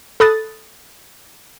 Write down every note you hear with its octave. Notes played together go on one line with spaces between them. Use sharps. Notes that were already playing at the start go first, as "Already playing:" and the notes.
A4 B5 D#6 F#6 A6